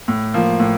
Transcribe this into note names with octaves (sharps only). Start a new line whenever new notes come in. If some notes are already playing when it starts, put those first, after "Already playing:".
A2
F3 A#3
A2